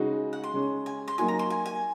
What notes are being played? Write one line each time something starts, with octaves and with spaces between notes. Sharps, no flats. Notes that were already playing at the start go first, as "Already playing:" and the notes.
Already playing: C#3 G#3 D#4 F#4
F#5
C6
C#3 G#3 C#4
G#5
C6
F#3 A#3 D#4 F#4 G#5
A#5
C6
G#5
G#5